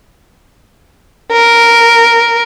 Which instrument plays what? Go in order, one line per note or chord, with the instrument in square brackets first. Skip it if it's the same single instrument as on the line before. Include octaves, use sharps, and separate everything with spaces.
[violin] A#4